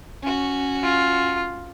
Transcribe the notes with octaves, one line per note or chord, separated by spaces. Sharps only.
C#4 F#4
F4